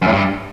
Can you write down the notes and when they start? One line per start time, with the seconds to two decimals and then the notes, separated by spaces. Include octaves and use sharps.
0.02 F#2
0.07 A2
0.12 G2